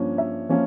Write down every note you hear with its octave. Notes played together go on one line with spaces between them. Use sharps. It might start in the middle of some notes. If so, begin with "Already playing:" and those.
Already playing: G2 F3 A#3 C#4
E5
F3 A#3 C#4 F4